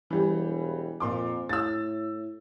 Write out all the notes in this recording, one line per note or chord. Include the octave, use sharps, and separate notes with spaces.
E1 E3 G3
F2 A#2 C6 D6
A2 E6 A6